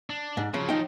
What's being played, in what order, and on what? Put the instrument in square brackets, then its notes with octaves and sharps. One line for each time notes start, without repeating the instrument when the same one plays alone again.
[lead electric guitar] D4
[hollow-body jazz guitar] G#2
[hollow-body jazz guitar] C#3 [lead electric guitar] F3 F#3
[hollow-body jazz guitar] D#4 G5